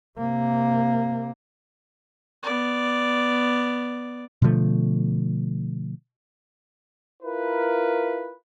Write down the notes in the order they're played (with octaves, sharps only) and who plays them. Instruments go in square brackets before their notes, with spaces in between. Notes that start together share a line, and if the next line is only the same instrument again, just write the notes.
[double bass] C3 A#3
[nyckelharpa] B3 D5
[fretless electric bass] B2 D3 F3 A3
[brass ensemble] E4 F4 A#4 B4